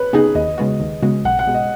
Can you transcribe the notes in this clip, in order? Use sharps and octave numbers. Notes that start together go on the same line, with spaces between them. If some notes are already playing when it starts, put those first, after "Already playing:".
Already playing: B4 C#5
C#3 B3 D#4 G#4
D#2 D#5
C#3 G#3 B3 F#4
D#2
C#3 G#3 B3 F#4
B1 F#5
F#5
B2 G#3
D#5